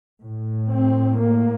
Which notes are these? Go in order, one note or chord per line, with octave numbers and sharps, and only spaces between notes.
A2
C4
A#3